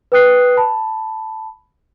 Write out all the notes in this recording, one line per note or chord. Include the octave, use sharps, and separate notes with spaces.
B4 G5 D#6 F#6 C7
A5 B5